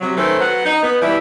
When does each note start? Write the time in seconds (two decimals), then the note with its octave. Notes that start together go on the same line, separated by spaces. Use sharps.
0.01 C3 F#3
0.16 D#3 A3 C#4 B4 C5
0.40 F#3 B3 F#5
0.65 D#4
0.83 B3
1.01 B2 E3 G3 E4